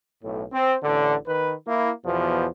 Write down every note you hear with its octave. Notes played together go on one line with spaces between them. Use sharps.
B1 A2
C4
A1 D3
D#3 B4
A#3 E4
E2 B2 F3